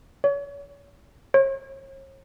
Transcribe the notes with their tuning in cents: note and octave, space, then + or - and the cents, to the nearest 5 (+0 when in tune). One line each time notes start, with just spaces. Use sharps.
C#5 +35
C#5 -45